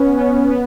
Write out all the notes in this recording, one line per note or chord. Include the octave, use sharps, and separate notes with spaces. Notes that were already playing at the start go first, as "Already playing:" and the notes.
Already playing: B3 C#4
B3
B3